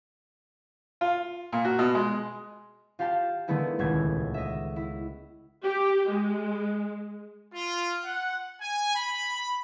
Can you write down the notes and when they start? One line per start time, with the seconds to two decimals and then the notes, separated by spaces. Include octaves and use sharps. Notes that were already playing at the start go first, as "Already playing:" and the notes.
1.01 F4
1.53 A#2
1.65 F#4
1.79 B2
1.94 G#3
2.99 F4 G4 F5 G5 A5
3.48 D3 D#3 A3 B3 E4 G#4
3.79 D#1 C#2 A3 G#6
4.34 D#5 E5
4.76 E4
5.63 G4
6.09 G#3
7.52 F4
8.04 F#5
8.60 G#5
8.94 B5